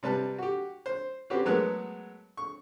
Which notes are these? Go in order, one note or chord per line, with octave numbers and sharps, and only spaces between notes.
C3 G3 B4 A5
F#4 G4
C5
C4 C#4 F#4 G4 B4
F#3 G#3 A3 B3 A#4 B4
C#6